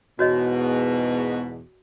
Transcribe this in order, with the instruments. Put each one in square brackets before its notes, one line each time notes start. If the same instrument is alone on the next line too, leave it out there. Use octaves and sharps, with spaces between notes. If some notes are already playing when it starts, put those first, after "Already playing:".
[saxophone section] E2 G#2 B2 [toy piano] F#4 C#5 D#5